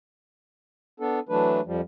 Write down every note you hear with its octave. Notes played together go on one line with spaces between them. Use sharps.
B3 D4 A4
E3 F#3 A3 D4 B4
F2 F3 G3